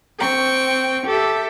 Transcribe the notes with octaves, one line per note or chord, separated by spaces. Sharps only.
C4 G5 C#6
G4 A4 E5